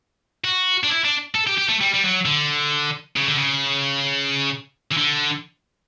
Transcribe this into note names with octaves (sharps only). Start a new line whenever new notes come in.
F#4
D4
E4
D4
A4
G4
G4
A3
G3
G3
F#3
D3
C#3
D3
C#3
E3
D3